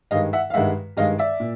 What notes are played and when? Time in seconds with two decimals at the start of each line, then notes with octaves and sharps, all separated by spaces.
0.11 G2 D#3 G#3 D#5 F5
0.33 E5 F#5
0.50 F5
0.54 G2 D#3 G#3 E5 F#5
0.97 G2 D#3 G#3 D#5 F5
1.18 D5 E5
1.40 A#2